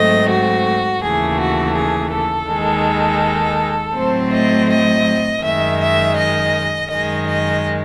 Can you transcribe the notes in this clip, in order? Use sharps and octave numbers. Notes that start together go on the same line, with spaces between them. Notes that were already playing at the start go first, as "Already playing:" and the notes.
Already playing: G#2 F#3 A3 C4 D#5
F#4
D#2 C#3 E3 A3 G#4
F#4
G#4
A4
D#2 D#3 G#3
A2 F#3 A3 C4 C5
D#5
D#5
F#2 D#3 G#3 E5
E5
D#5
F#2 D#3 G#3 D#5
D#5